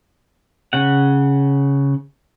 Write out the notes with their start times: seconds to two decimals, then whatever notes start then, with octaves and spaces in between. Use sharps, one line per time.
0.73 C#3 F#5